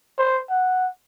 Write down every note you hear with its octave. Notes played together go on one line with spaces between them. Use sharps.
C5
F#5